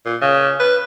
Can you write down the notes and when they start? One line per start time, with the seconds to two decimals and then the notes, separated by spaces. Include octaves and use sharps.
0.06 A#2
0.21 C#3
0.60 B4